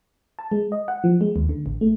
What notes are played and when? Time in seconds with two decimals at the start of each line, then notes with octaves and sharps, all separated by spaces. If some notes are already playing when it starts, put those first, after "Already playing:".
0.39 A5
0.51 G#3
0.72 D#5
0.88 F#5
1.04 F3
1.21 G#3
1.36 D#2
1.49 D3
1.66 A1
1.81 A3